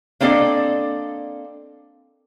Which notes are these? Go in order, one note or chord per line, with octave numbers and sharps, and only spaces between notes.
A#3 C4 D4 A4 D5 D#5